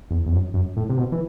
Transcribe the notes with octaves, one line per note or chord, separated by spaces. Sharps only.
E2
E2
F#2
F#2
A2
C3
B2
E3